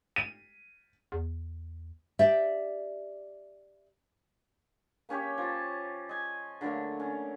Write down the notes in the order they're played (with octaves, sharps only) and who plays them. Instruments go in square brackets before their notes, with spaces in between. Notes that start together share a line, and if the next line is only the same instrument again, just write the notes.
[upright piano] D#7
[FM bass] E2
[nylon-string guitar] G4 D5 E5
[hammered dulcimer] A#3 C#4 G4 C#5
F3 A5
D#5 G#5
D3 F#3 A3 A#3
C#4